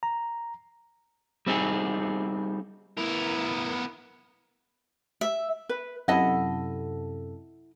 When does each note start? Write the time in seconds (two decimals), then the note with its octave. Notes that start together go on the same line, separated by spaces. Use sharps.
0.03 A#5
1.47 G3 C4 D#4 G#4
2.97 B3 E4 A#4
5.21 E5
5.69 B4
6.08 F#2 C3 E4 A4 D#5 F#5